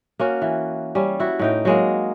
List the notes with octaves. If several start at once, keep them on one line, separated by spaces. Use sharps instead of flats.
A#3 C#4 F#4
E3
G3 C#4
E4 F#4
A2 D#4 G5
F#3 G#3 A#3